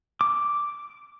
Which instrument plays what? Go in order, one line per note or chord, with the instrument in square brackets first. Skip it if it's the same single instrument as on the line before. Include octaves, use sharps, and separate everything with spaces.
[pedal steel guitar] D6